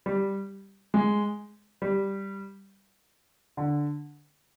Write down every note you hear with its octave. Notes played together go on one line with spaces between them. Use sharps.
G3
G#3
G3
D3